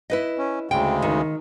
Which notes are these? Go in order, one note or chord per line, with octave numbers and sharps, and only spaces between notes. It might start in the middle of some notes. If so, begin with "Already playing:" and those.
E4 B4 D#5
C#4
D2 C#3 G#3 G5
D#3